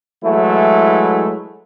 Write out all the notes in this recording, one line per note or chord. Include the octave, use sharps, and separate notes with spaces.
E3 F#3 G#3 A3 E4